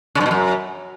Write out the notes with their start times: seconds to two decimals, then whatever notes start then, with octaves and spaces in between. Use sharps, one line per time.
0.15 C#3
0.21 G2
0.26 B2
0.31 F#2